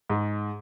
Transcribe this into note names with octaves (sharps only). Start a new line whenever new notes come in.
G#2